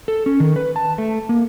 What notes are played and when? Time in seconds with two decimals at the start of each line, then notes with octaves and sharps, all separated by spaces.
0.08 A4
0.26 C#4
0.40 D#3
0.56 B4
0.76 A5
0.98 A3
1.29 A#3